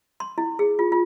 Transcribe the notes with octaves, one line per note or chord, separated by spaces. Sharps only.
C6
E4
G#4
F4
F4